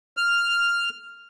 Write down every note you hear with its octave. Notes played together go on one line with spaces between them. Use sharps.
F6